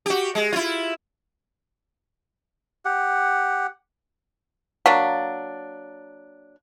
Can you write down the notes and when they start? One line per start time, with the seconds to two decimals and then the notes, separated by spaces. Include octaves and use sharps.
0.06 F#4 G4
0.35 G#3
0.53 E4 F4
2.85 G4 F#5
4.86 F#3 A#3 D4 F5